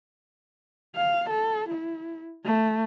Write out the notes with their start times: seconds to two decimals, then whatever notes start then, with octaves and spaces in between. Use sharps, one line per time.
0.96 F5
1.30 A4
1.69 E4
2.45 A3